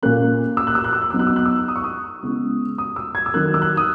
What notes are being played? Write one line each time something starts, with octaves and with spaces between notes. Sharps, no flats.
A#2 A#3 C#4 F#6
E6
F#6
E6
F#6
E6
F#6
F#3 B3 D#4 E6
F#6
E6
F#6
E6
D#6
C#6
D#6
C#3 G#3 B3 E4
D#6
E6
G#6
E6
D#3 F#3 A#3 F#6
E6
F#6
D#6